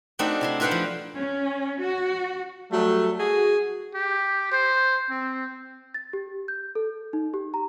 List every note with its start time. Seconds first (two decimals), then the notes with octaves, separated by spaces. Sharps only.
0.19 A3 C4 D4 D#4 F#4 A4
0.41 C3 E4 C6
0.60 E4 F4 B4 F#5 G5 C6
0.71 F3
1.16 C#4
1.79 F#4
2.72 F#3 G3 A3
3.19 F#4 G#4
3.95 G4
4.52 C5
5.10 C4
5.94 A6
6.13 G4
6.48 G6
6.75 A4
7.13 D#4
7.34 G4
7.54 A#5